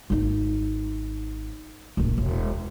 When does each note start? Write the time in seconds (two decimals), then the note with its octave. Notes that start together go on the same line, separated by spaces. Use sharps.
0.10 G#1 D#4
1.97 D1 A#1
2.18 E1